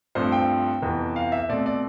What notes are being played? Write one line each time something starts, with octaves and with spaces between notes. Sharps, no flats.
G2 F3 A3 C4 C5
G5
F2 C3 E3 B3
F5
E5
B2 A3 C4 D5
D5